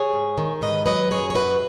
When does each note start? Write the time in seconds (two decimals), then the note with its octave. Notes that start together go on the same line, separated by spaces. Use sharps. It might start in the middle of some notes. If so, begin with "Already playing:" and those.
Already playing: G#4 C#5
0.13 G#2
0.38 D#3
0.61 G#2 B4 D#5
0.86 F#3 B4 D#5
1.11 F#2 G#4 C#5
1.30 C#5
1.35 F#2 F#4 B4